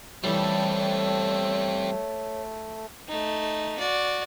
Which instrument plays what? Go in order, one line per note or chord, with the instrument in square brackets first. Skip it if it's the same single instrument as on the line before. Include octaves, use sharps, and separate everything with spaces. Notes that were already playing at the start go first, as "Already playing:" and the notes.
[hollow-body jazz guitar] E3 G3 [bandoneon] A3 [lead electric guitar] C4 A4 [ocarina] C#5
[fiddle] A3 D#4
F#4 D5